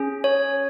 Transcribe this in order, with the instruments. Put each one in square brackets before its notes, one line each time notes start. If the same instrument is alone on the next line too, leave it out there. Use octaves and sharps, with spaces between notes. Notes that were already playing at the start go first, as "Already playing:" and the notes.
Already playing: [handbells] C#4 G#4
C#5